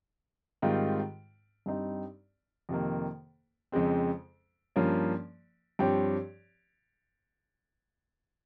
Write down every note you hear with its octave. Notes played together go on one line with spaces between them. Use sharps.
G#2 D#3 G3 C4 F4
G2 G3 C4 D#4
F2 C3 D#3 A#3
F2 C#3 G#3 C4
G2 F3 A#3 C#4
G2 F3 C4 G4 C#5